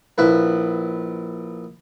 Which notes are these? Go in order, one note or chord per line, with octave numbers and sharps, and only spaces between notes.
A#1 E4 B4